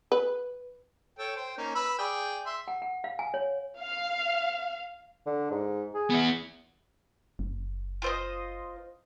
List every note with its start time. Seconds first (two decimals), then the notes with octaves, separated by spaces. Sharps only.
0.12 B4
1.19 A4 C#5 G5
1.36 C5 G5
1.58 A#3 C#4 D#4
1.75 B4 B5 E6
1.98 G#4 D5 G5
2.46 E5 C6
2.68 F#5
2.82 F#5
3.04 F5
3.19 G#5
3.34 C#5
3.79 F5
5.26 D3
5.51 G#2
5.95 G#4
6.10 B3 E4
7.39 F#1
8.02 F4 C5 D#5